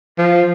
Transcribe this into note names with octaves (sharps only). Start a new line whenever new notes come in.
F3